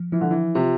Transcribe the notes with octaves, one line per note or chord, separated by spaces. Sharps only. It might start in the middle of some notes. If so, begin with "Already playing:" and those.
Already playing: F3
E3 F3
D3
E3
C3 F4